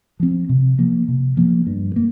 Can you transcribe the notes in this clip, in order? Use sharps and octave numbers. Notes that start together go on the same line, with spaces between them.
F3 C4
C3
F3 A#3
C3
F3 A#3
G2
A#3